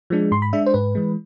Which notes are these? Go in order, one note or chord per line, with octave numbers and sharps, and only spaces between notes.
F3 G#3 D4
G#2 C6
B5
G#3 D4 E5
C5
G#2 B4
E3 G#3